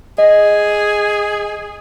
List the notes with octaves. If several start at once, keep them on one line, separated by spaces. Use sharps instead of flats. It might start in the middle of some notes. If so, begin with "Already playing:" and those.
G#4 D#5